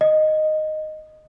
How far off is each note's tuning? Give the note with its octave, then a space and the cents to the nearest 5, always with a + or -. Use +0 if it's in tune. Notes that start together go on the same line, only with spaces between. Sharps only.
D#5 -5